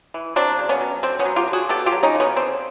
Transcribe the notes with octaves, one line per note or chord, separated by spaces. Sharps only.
E3
F#3 C4 D4
C#3
B3 C#4
F#3
D3 C4
B3 C#4
F#3
F4 G4
D3
F#4 G#4
B3 G4 A4
F4 G4
F#3
C#4 D#4
C#3
B3 C#4
D3 C4